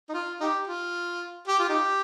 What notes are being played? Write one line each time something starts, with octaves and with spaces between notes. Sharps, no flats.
D#4
F4
D#4 G4
F4
G4
F4
D#4 G4